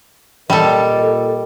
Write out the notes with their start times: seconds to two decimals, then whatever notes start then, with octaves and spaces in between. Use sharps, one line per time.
0.50 A#2 G3 A4 A#4 D#5